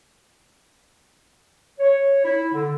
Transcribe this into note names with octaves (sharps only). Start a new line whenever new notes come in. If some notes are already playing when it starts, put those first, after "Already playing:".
C#5
E4
D3